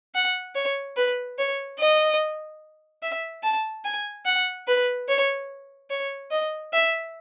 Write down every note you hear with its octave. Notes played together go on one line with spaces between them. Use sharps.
F#5
C#5
B4
C#5
D#5
E5
A5
G#5
F#5
B4
C#5
C#5
D#5
E5